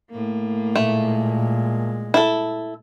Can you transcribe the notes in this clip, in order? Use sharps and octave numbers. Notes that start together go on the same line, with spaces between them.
A2 A#3
A#2 G#3 A3
E4 A4